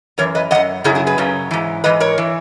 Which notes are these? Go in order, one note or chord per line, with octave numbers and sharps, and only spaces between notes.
F#2 E3 A#4 C#5
B4 D#5
F#2 E3 D#5 F#5
F#2 C#3 F#3 E4 G#4
E4 G#4
G#4 B4
F#2 C#3 F#3
G#2 E3
G#2 E3 B4 D#5
A#4 C#5
E3